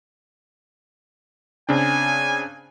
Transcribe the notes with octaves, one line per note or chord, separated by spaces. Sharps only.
C#3 C4 D4 G#5